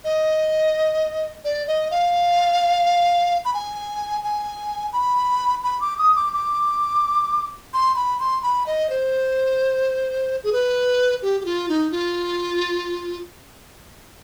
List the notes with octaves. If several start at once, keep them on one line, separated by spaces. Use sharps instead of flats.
D#5
D5
D#5
F5
B5
G#5
G#5
B5
B5
D6
D#6
D6
D6
C6
B5
C6
B5
D#5
C5
G#4
B4
G4
G4
F4
D#4
F4